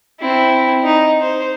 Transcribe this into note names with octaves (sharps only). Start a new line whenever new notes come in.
C4 E4
D#4
C5